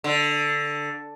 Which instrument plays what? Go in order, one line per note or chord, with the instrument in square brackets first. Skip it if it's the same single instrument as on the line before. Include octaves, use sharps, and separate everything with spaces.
[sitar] D3